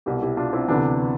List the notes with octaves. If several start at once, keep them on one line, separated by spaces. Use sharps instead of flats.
C2 B2 E4 G4
E4 G4
D4 F4
C4 E4
D2 C3 E3 B3 D4
B3